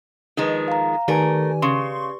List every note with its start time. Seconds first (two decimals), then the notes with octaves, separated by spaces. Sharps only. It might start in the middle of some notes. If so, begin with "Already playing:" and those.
0.37 D#3 F3 G#3 F4 B4
0.68 F5 A#5
1.08 D#3 A3 G4 A#4 B4 D5 G#5
1.62 C#3 C6 C#6